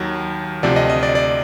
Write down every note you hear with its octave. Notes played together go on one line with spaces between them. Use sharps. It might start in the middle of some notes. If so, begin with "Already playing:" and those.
Already playing: D#2 D#3 F#3
D2 C3 F3 D5
D#5
D#5
D5
D5